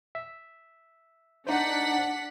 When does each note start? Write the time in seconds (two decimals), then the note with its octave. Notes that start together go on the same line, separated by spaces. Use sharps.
0.15 E5
1.47 D4 D#4 C5 F#5 B6